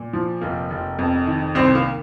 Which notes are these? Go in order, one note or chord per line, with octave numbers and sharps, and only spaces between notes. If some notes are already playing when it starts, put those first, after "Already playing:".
Already playing: A#2
F3
F1 A#3
F1
F2
D#3
C2 C4
A#3